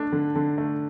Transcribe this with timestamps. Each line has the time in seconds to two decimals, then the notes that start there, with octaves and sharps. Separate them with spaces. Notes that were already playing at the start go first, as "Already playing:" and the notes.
Already playing: A3 D4
0.12 D3
0.36 D3
0.58 A3